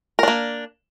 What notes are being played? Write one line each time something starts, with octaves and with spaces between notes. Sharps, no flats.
A#3 D4 A#4